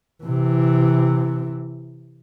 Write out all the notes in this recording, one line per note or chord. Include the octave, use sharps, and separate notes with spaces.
C3 E3